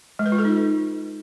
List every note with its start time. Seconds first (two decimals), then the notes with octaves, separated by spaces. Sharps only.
0.19 G#3
0.26 B4
0.32 F4
0.39 A4
0.45 D#4